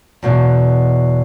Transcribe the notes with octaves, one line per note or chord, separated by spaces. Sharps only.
E2 B2 F#3